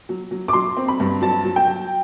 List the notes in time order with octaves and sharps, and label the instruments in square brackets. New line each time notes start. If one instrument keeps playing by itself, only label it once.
[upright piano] F#3
F#3
D6
F#3 C6
C4
B5
G2
F#3 A5
F#3
G5
F#3